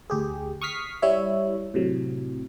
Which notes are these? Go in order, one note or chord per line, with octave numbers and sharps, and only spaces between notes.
D2 G4 G#4
C#6 D#6 F6 B6 C7
G3 E4 C#5 E5
A2 C3 F#3